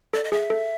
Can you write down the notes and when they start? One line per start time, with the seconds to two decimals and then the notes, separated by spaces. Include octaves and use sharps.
0.13 A4 D5
0.24 D#5
0.32 G#4 E5
0.50 A4